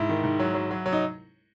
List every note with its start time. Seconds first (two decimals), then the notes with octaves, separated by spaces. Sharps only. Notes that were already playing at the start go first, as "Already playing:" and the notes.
Already playing: G#2 E4
0.09 D#3
0.24 G#2
0.39 F#3
0.54 F#3
0.71 F#3
0.86 F#3
0.93 D#4